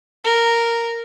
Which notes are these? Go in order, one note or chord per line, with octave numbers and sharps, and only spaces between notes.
A#4